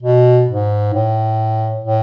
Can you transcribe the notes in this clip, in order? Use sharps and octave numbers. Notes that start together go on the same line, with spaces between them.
B2
G#2
A2
A2